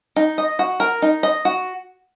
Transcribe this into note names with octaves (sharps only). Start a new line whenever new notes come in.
D#4
D#5
F#4
A#4
D#4
D#5
F#4